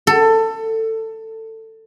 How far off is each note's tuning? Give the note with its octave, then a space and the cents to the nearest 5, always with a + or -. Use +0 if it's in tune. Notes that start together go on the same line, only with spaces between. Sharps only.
A4 +20